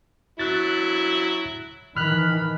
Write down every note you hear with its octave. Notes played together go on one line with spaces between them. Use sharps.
F#3 E4 F#6 A6
D#3 E3 B5 F6 F#6